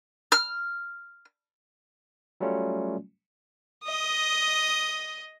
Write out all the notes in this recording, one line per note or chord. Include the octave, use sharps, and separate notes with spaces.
F6
F#3 G3 A3 C#4 F4
D#5 D#6